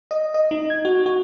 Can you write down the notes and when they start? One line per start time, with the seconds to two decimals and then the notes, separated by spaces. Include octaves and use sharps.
0.11 D#5
0.34 D#5
0.51 D#4
0.70 G#6
0.85 F#4
1.06 F#4